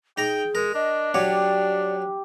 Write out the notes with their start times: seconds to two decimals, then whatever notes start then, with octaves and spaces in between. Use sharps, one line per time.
0.18 D#4 G#4 G5 A#5
0.55 G#3 A#4
0.74 D4 D#5
1.14 F#3 G4 C#5 D5